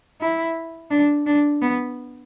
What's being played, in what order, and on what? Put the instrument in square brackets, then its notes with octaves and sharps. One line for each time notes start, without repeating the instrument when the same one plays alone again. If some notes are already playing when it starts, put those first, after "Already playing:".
[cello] E4
D4
D4
B3